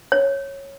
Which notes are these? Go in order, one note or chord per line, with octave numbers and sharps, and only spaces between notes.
C#5